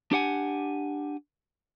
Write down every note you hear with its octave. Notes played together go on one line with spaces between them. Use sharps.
D4 G4 F#5 G#5